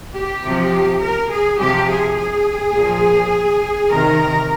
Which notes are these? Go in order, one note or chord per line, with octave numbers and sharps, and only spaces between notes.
G4
C3 F3
A#4
G#4
C3 F3 G4
G#4
G#4
A#2 F3
C3 D#3 A#4